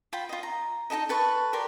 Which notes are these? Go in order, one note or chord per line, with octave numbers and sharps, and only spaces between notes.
F4 G5 B5
F4 D#5
A#5
D#4 G4 A4 D#5
A4 B4 A5 C#6
G4 A#4 D5 C6